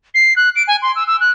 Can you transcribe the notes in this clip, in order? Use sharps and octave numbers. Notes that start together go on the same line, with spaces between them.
C7
F#6
D7
G#5
C6
E6
E6
F#6